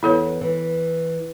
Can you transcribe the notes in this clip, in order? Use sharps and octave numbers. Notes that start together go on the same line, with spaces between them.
E2 E3 E4 A4 C#5
E3